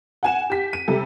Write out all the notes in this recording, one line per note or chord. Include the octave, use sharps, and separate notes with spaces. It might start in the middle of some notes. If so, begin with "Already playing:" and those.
F#5 G#5 E7
G4 B6
D#7
C3 G3 A4